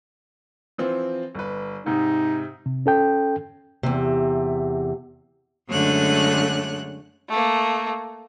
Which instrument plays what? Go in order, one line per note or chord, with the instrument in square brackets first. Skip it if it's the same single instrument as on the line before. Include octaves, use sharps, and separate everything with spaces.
[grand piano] E3 F3 C4
G1 B4
[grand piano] G#2 C3 [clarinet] D#4
[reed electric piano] C3
C#4 A4 G5
[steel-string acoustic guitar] E2 C3
[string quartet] F#2 D3 G#3 A3 C#5 F#6
[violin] A3 A#3